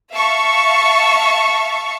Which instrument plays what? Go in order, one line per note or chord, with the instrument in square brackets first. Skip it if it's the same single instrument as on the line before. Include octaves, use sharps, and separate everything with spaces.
[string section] E5 F5 A5 C#6